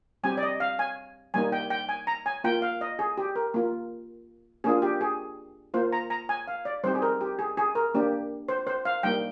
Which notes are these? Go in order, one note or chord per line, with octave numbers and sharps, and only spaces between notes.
G3 C4 G4 G#5
D5
D#5
F5
G#5
G3 A#3 D#4 G#5
G5
G5
G#5
A#5
G#5
A#3 F4 G5
F5
D#5
G#4
G4
A#4
A#3 F4
A#3 D4 F4 G#4
G4
G#4
A#3 F4 C5
A#5
A#5
G#5
F5
D5
G3 C4 D#4 G4 C5
G#4
A#4
G4
G#4
G#4
A#4
A#3 D4 G4
C5
C5
F5
G3 A#3 D#4 G5